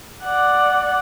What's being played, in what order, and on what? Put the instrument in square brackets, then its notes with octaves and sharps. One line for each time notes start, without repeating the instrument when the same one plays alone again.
[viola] D5 F#5